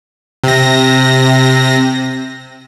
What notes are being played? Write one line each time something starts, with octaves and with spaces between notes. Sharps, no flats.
C3 A#6